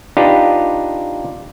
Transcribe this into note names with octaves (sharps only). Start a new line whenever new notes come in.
D4 D#4 F4 G4 B4